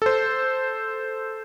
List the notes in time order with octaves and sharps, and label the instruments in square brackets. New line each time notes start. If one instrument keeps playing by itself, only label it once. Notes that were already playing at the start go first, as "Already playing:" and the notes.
[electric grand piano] A4 C5